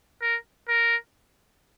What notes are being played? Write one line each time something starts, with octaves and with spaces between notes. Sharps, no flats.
A#4
A#4